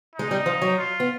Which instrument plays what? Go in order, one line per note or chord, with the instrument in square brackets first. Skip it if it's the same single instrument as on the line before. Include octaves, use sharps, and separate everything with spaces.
[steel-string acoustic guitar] G#3 [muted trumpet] D#4
[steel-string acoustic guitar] G3
F3
F#3
[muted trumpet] F4
[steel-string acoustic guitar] B3